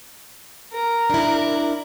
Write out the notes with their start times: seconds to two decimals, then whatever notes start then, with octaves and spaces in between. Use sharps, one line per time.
0.73 A#4
1.10 D4 E4